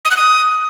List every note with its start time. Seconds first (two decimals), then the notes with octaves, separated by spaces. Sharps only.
0.05 D#6
0.11 F#6
0.17 D#6